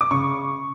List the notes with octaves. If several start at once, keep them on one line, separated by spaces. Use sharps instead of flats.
D6
C#3 C#6